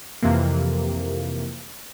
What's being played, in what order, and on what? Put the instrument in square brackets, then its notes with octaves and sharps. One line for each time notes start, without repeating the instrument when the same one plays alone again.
[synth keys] F2 C3 E3 A#3